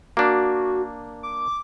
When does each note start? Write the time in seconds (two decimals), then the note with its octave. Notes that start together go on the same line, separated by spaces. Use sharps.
0.17 A#3 D4 F#4
1.23 D6